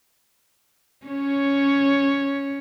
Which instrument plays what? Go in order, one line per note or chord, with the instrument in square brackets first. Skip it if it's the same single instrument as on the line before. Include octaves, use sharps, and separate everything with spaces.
[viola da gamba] C#4 C#5